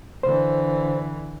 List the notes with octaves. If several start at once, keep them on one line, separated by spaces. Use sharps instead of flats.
D3 E3 C5